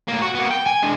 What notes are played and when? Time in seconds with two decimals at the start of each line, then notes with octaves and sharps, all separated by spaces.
0.08 A2 A#3
0.22 F#4
0.34 A#3 B3
0.50 G5
0.66 G#5
0.83 G#3 D4